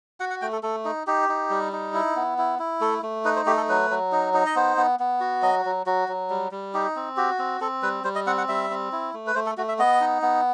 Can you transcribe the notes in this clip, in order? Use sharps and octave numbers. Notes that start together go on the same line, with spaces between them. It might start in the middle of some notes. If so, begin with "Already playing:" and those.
F#4 F#5
F#5
A3 G5
A4
A3 A4
D#4
D#4 G4
D#4
G3
D#4
E4
B3
E4
E4
A3 A4
A3
D#4 B4
C5
A3 G4
A4
F#3 B4
F#3
D#4
D#4
D#5
B3 C5
B3
B3
F#4
F#3 D#5
F#3
F#3 F#4
F#3
G3
G3
D#4 G4
C4
F#4 G4
C4
C4 A4
G3 B4
G3 C5
D#5
C4 F#5
F#5
G3 E5
C4
E4
A3
B4
A3 C5
A4
A3 F#4
E5
B3 D#5
D#4
B3